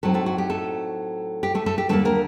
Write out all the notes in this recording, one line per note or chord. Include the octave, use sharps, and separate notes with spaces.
A2 F#3 A3 C4 D#4 A4
A3 A4
F#4
G4
A3 A4
G4
A3 A4
A3 A4
G4
D#2 D3 G3 A3 A#3 A4
A#3 A#4